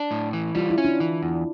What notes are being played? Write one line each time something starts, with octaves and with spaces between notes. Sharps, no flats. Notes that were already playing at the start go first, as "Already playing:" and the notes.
Already playing: D4
A2
E3
G3 F4
E4
C#4
D4
E3
E2